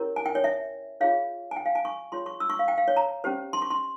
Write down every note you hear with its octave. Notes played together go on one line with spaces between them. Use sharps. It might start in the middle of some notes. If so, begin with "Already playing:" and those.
Already playing: C#4 E4 G4 A#4 C#5
G#5
G5
C#5
E5
F4 G#4 C#5 F5
G#5
G5
F5
G#5
C#6
F4 G#4 C#5 C6
C#6
E6
C#6
F5
G5
F5
C#5
A#5
C#4 G4 C5
C6
C#6
C6